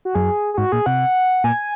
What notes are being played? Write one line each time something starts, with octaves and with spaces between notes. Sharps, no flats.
F#4
F#2 G#4
G#4
G#2 F#4
A#2 G#4
C3 F#5
A#2 G#5